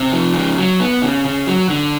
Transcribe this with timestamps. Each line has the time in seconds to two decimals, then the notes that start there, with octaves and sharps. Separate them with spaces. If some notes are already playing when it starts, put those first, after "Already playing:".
Already playing: C3
0.12 F3
0.34 C#3
0.57 F#3
0.80 B3
1.02 C#3
1.25 C#3
1.47 F#3
1.69 D3